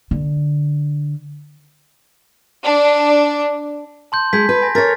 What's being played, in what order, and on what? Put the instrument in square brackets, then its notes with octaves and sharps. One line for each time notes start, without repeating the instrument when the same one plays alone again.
[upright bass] D3
[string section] D4
[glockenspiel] A5 C6 G6
[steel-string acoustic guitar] G#3 [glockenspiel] G6 G#6 B6
[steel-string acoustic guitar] B4
[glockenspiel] G#5 A#6
[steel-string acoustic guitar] A#4 C#5 [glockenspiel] A6 B6